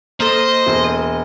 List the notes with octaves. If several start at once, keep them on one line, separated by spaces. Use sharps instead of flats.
A#3 A4 C5 D#5
E1